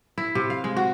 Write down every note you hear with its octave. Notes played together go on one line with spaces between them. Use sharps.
E4
C3
F5
G#3
F#4